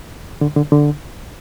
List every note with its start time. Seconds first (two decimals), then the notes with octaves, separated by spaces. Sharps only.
0.41 D3
0.56 D3
0.72 D3